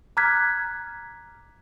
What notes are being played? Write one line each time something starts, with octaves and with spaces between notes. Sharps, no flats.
A#5 D6 F6 F#6 G#6 B6